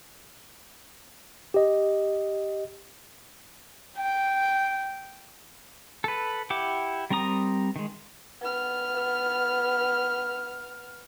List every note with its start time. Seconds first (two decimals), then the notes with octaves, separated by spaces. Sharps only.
1.54 G4 D#5
3.97 G5
6.04 A4 B4
6.50 E4 G4 F#5 D6
7.10 G3 C4 A#4 A#5 D#6
7.76 D#3 G#3
8.41 B3 F6